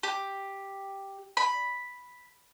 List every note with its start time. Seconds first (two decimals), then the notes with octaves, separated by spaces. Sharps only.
0.03 G4
1.37 B5